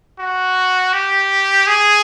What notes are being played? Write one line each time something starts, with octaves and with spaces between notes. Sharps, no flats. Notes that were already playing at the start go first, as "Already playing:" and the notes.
F#4
G4
G#4